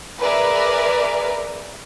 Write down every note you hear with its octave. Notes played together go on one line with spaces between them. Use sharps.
G#4 A#4 B4 D5 E5